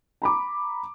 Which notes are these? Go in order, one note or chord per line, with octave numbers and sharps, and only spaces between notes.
A#5 B5 D6